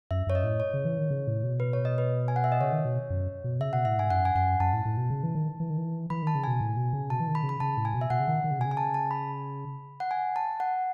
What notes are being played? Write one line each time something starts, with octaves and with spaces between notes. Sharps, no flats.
F#2 E5
F#2 C#5
D#5
A2
C#5
C#3
E3
D#3
C#3
A2
B2
B4
C#5
D#5
B4
G#5
F#5
E5
D#5
C#3 C#5
D#3
B2
F#2
B2
C#3 E5
B2 F#5
A2 E5
G#2 G#5
F#2 F#5
G#5
F#2 F#5
F#2 A5
A2
A2
B2
C#3
E3
D#3
E3
D#3
E3
E3 B5
D#3 A5
C#3
B2 G#5
A2
B2
C#3
B2 A5
E3
D#3
B5
C#3
B5
C#3 A5
A2
G#5
B2
E5
B2 F#5
C#3
D#3
D#3
C#3
B2 G#5
C#3
G#5
A5
A5
B5
F#5
G#5
A5
F#5